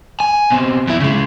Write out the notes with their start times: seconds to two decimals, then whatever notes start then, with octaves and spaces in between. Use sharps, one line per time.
0.20 G#5
0.50 B2 C4
0.87 E2 E4
1.00 C#3 G#3